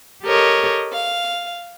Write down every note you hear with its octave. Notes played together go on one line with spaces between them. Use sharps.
G4 A4 A#4 C#5 D#5
F5